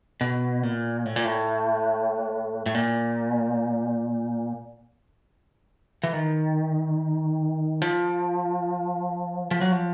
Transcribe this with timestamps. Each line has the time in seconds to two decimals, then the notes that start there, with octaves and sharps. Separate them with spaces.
0.21 B2
0.63 A#2
1.06 A2
1.16 A#2
1.25 A2
2.66 A2
2.74 A#2
6.03 E3
6.13 D#3
7.82 F3
9.51 F3
9.61 F#3
9.72 F3